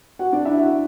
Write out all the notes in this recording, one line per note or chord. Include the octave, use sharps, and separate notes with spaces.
F#4 F#5
D4 D5
E4 E5
F#4 F#5